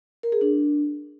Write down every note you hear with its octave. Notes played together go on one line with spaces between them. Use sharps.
A#4
G#4
D4